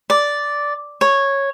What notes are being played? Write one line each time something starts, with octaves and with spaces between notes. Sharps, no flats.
D5
C#5